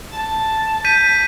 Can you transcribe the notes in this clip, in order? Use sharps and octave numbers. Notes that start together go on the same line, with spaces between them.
A5
G6 B6 D#7